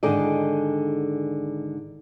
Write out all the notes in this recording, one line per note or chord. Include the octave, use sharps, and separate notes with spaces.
G#2 D3 D#3 G#4 D5 D#5